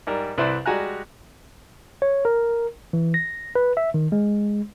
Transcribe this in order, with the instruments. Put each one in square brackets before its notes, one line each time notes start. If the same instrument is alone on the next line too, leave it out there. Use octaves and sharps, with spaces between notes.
[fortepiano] G#2 G3 A#4
C2 E4 B4 C5 D5
G3 G#3 F#4 G#5 A#5 F#6
[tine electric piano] C#5
A#4
E3
A#6
B4
E5
D#3
G#3